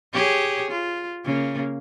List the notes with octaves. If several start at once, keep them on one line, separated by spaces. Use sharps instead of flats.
G4 G#4 C#5
F4
C#3 A#3